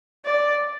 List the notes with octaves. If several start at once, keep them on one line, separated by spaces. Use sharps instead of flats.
D5